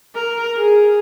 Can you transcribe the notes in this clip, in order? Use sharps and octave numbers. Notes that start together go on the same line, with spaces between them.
A#4
G#4